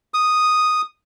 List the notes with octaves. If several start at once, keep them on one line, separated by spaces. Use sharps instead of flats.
D#6